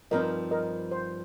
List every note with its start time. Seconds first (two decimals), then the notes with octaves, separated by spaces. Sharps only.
0.11 G2 F3 C4 D#4 A#4 D#5
0.51 A#4 D#5
0.91 C5